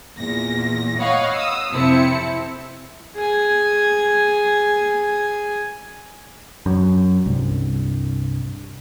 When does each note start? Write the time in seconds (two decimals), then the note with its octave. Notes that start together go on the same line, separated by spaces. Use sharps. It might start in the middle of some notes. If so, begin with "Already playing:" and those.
0.16 E2 A#2 A#6
1.00 C#5 D#5 F5 F#5 B5 C#6
1.34 D#6 E6
1.73 F2 C3 C4 E4 A5 C#7
3.15 G#4 G#5
6.66 F#2
7.26 C2 G2